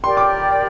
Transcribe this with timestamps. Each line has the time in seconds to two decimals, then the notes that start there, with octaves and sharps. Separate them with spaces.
0.04 G4 A#4 D5 G5 C6
0.17 D6